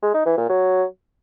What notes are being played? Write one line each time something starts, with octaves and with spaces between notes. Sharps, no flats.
G#3
D#4
E3
A#2
F#3